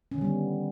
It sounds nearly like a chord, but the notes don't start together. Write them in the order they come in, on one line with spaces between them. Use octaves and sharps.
C#4 D#3 D3 G3 B3